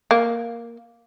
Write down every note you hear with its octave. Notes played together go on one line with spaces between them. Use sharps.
A#3